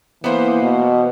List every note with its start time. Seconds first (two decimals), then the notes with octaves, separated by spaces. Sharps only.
0.24 E3 A#3 B3 C5
0.62 B2